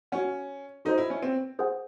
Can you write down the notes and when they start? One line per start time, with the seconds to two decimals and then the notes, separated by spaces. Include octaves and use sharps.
0.12 C#4 F#4 C#5 F#5
0.85 D#4 F#4 A4 C5 D#5
0.98 E4
1.10 C#4
1.23 C4
1.59 G#4 C5 F#5